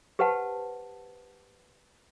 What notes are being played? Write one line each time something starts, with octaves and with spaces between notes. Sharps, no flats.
G4 B4 C5 F#5 A5